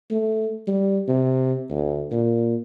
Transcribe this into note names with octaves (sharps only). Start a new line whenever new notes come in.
A3
G3
C3
D2
A#2